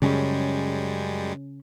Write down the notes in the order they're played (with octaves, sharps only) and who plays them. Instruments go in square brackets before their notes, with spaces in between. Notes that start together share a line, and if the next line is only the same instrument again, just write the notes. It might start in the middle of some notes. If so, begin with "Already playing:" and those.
[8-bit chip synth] F#2 G3 G#3 [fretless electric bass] C#3 C#4